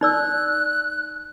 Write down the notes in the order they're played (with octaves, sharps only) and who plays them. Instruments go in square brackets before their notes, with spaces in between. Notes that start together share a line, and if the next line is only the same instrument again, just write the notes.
[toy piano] D#4 D5 E6 [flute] F#6